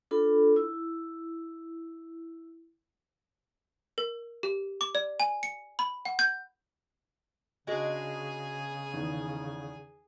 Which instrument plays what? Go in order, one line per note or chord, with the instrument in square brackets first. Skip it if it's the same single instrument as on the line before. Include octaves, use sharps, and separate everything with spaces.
[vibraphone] D4 F4 A4 B5
E4
[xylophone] A#4
G4
D6
D5
G#5
C#7
B5
F#5
G6
[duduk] C#3 [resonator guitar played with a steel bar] G#3 D4 [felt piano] F#4 [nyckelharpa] G#4 G#5
[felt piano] E2 D#3 E3